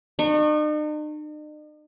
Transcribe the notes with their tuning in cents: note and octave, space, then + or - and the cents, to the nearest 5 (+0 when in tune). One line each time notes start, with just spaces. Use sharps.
D#4 -45 C#6 -20